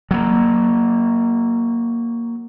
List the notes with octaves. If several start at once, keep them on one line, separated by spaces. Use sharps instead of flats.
F#3 A#3